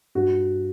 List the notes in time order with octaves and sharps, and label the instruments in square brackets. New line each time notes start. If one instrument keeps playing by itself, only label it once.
[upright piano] G2 F#4